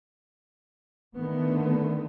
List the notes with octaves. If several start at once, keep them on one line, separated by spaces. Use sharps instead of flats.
D3 D#3 A3 B3